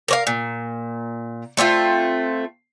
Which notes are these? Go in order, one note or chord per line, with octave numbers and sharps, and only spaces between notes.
A#4 C#5 F5
A#2
A3 C4 D#4 F4